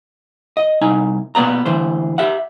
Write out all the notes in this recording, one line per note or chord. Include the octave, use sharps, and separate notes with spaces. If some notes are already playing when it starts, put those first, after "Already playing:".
D#5
C2 D#4 G#5
B2 A#3 B3 D5 A#5
D2 E3 C5
G4 E5 F#5